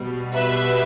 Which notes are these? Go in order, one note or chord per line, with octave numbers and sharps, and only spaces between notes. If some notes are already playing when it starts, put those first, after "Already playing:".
Already playing: B2 G3
B4 E5